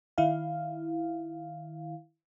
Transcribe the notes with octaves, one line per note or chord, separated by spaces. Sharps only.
D#3 E4 F5